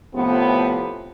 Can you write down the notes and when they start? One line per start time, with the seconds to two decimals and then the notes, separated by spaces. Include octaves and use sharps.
0.13 A2 C3 F3 B3